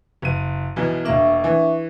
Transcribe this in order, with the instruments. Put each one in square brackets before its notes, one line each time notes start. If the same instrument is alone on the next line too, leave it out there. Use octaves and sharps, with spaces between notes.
[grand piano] F#1 D#7
B1 B2 E3
[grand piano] E1 A#3 [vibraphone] D4 E5 C#6
[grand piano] E3